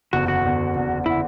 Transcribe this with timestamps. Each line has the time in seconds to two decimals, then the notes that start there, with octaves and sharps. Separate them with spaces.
0.13 F#1 E2 D3 F#4
0.28 F#4
0.44 F#1 E2 D3
0.75 F#1 E2 D3
1.06 D3 E4